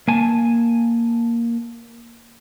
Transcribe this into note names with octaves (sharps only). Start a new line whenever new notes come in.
A#3 G#5 A5